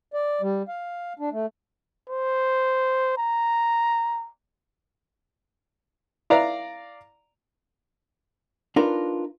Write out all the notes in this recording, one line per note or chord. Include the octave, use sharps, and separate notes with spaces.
D5
G3
F5
D4
A3
C5
A#5
E4 B4 D5 E5 F5 A#5
D4 D#4 F4 A#4 B4